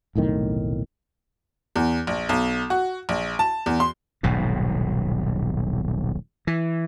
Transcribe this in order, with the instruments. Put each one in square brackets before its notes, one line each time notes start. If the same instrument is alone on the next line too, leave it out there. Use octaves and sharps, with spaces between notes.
[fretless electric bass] F1 B1 A2 D#3
[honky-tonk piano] E2
A#1
B1
F#4
A#1
A5
E2
C6
[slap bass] D#1 B1 G#2 B2
E3